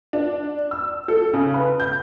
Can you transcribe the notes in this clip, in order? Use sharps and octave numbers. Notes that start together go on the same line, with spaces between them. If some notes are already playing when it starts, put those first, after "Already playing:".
D4
E6
A4
C#3
B4
G6